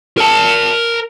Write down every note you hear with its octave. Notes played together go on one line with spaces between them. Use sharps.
A#4 A5